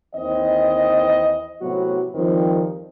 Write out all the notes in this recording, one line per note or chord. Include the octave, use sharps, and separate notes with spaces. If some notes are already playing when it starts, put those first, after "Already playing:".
D#2 E3 C4 D#5
A2 C3 F#3 B3 F#4
F2 D#3 F3 G3 C4